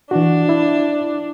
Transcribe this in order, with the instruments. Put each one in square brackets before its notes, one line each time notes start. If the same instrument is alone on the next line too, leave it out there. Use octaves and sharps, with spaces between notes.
[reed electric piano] E3 F#4 [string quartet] D4
[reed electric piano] E4